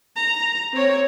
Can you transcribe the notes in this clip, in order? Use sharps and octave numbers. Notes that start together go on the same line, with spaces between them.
A#5
C4 C#5